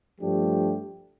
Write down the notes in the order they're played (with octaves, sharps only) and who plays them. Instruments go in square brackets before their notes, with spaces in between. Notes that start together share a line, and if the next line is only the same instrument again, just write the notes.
[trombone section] G2 F3 A3 D4 G4